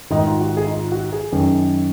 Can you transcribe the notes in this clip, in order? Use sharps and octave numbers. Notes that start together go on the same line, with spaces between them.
G#2 D#3 D#4
F4
F#4
G#4
D#4
F4
F#4
G#4
F#2 D#3